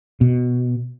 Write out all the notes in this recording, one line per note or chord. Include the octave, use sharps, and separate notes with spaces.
B2